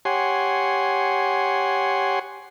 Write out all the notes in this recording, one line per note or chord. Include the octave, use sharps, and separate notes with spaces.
G4 C#5 F#5 G#5 C6